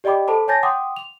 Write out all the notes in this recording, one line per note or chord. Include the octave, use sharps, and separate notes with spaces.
G4 D5 D#5 G5 B5 D6
A4 C5 A5 B5 D6
C#5 G#5 A5 G6 A6 A#6
F#5 G5 C6 D6 D#6
F7